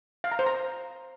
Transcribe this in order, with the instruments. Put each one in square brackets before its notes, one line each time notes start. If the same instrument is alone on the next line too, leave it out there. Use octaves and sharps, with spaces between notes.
[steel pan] F5
A#5
C5
A#5